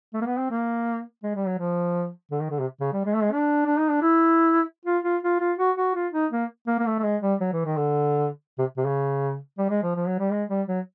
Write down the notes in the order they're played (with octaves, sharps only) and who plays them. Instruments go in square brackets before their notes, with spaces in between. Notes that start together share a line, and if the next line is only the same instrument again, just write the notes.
[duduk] A3
A#3
B3
C4
A#3
G#3
G3
F#3
F3
D3
D#3
D3
C3
C#3
G3
G#3
A3
G#3
D4
D4
D#4
D4
E4
F4
F4
F4
F4
F#4
F#4
F4
D#4
A#3
A#3
A#3
A3
A3
G#3
G3
F#3
E3
D#3
D3
C3
C3
C#3
G3
G#3
F3
F3
F#3
G3
G#3
G3
F#3